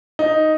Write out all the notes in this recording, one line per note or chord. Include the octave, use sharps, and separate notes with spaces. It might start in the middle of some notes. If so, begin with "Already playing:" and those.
D#4